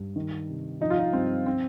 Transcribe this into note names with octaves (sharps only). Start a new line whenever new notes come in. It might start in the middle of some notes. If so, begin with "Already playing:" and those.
Already playing: G2
D#3
C3
F3 D#4
F4
D#4
G2 C4
C4